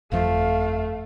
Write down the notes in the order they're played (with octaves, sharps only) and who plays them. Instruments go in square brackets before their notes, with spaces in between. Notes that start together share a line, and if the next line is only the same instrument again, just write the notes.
[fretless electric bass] G1 F2 F3 [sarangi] A3 [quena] F5